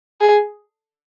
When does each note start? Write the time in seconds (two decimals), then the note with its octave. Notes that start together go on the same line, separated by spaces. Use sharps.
0.21 G#4